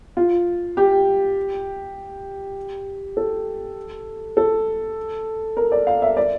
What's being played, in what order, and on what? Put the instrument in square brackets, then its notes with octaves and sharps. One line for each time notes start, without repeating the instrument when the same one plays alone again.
[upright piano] F4
G4
A4
A4
A#4
D5
F5
E5
D5